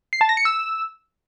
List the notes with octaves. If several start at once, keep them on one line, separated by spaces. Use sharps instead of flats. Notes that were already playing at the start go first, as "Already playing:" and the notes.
C7
A5
A#6
C#7
E6